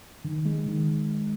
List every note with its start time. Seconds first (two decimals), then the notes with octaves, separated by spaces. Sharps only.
0.24 D#3
0.45 G#3
0.66 D#3